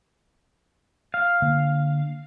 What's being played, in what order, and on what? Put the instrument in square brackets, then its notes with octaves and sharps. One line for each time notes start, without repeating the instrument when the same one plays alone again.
[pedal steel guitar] F5
[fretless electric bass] D3 A#3